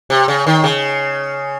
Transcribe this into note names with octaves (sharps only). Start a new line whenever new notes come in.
C3
C#3
D#3
C#3